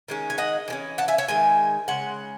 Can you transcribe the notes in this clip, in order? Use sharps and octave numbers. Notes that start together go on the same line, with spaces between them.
D#3 G#3 C#4
G#5
D#5 F#5
E3 G#3 C#4
F#5 A5
E5 G#5
C#5 E5
D#3 G#3 G#5
C#3 G#3 F#5